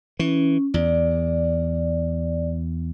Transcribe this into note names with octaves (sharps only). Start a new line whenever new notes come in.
E3 C#4
E2 D5